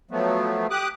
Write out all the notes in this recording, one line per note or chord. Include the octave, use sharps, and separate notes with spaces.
F3 F#3 A3 B3
G4 D6 D#6 F#6